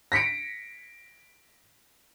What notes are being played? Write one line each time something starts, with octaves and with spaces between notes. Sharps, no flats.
A#6 B6 C#7 D7